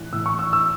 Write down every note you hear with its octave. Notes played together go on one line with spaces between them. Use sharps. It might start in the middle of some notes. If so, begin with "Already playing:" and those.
Already playing: A2 E3 F#6
A2 E3 E6
C#6
E6
E6